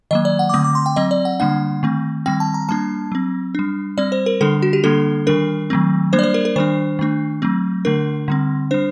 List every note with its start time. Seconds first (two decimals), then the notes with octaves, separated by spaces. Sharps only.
0.11 D#3 F#3 A#3 D#5
0.25 D5
0.39 F#5
0.49 D6
0.54 D3 A3 C4 D#6
0.64 D6
0.75 C6
0.86 G5
0.96 F#3 C4 D#5
1.11 D5
1.25 F#5
1.40 D3 G3 A#3 D4 F#5
1.83 D#3 A3 C4
2.26 D#3 G3 C4 G5
2.40 A5
2.54 A#5
2.69 G3 A#3 D4 A5
3.12 F#3 C4
3.55 G3 D4
3.98 G3 C4 D5
4.12 C5
4.26 A#4
4.41 D3 G3 D4 A4
4.62 F#4
4.73 G4
4.84 D3 G3 A#3 D4 A4
5.27 D#3 G3 D4 A#4
5.70 D#3 F#3 A3 C4
6.13 G3 A#3 D4 C5
6.19 D5
6.24 C5
6.34 A#4
6.45 A#4
6.56 D#3 G3 D4 C5
6.99 D#3 A3 D4
7.42 F#3 A3 C4
7.85 D3 A3 D4 A#4
8.28 D3 G3 C4
8.71 G3 D4 C5